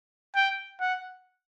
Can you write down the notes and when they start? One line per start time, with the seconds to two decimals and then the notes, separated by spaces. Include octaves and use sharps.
0.35 G5
0.81 F#5